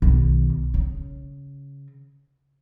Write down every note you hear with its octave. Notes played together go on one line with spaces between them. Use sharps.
B1 D#3
C#3